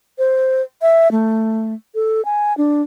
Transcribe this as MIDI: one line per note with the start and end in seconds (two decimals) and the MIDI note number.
0.18 0.62 72
0.82 1.11 76
1.11 1.74 57
1.95 2.24 69
2.25 2.56 80
2.58 2.82 62